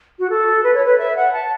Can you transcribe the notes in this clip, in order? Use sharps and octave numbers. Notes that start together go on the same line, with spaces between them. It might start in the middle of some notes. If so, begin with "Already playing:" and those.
F#4
A4
B4
C#5
B4
E5
F#5
A5